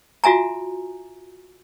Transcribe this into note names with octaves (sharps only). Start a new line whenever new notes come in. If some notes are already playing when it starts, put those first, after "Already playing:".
F4 F#4 E5 G#5 A#5